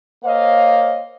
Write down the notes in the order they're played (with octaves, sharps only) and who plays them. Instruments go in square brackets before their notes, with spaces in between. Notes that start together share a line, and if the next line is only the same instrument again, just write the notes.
[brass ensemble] A#3 C5 C#5 D#5 F5